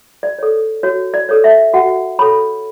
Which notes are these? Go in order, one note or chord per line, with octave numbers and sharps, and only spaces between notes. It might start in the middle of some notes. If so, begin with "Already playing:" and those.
D5
A4 C#5
F#4 C#5
D5
A4 C#5
E5
F#4 F#5
A4 C#5 B5